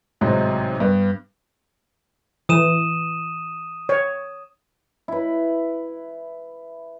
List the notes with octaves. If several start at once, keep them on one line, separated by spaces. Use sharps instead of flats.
A1 G#2 C3 F#3 C5 D#5
G2 B3
E3 D#6 D#7 E7
C#5
E4 B4